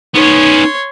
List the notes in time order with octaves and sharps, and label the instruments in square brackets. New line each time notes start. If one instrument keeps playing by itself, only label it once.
[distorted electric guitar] B3 C#4 [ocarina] D#4 [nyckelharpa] C#5 C6